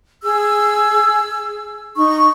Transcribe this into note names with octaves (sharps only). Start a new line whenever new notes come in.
G#4 E6
D#4 C#6